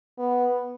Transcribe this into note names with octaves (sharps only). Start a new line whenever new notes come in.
B3